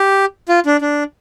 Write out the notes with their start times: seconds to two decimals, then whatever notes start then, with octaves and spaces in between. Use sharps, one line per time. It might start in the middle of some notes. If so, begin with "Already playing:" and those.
Already playing: G4
0.49 F4
0.66 D4
0.81 D4